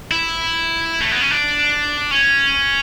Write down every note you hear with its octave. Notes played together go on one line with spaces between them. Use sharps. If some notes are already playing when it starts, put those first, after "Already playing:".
E4
A3
B3
C#4
D4
C#4